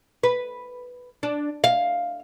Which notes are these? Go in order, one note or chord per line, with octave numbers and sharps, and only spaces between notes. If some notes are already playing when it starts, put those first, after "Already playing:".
B4
D4
F5